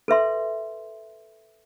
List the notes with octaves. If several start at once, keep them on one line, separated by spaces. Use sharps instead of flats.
A4 B4 E5 C6